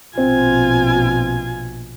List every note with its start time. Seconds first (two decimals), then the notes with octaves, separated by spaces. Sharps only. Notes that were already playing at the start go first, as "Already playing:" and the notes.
0.18 A#1 B2 C4 F4 G#5